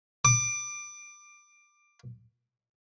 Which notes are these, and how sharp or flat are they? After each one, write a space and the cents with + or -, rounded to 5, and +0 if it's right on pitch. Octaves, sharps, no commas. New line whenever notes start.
D6 +20